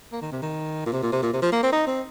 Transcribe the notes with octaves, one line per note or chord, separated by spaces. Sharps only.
A#3
D#3
C3
D#3
A#2
C3
A#2
C3
A#2
C3
F3
A#3
C4
D#4
C4